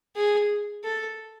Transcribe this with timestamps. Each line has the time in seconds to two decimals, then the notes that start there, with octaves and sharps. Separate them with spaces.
0.16 G#4
0.84 A4